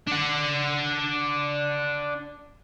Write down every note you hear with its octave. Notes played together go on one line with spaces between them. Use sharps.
D4 F#5